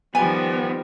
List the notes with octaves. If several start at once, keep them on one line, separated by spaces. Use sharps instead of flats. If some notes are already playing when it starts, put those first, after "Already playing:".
D#3 F3 G3 B3 G#5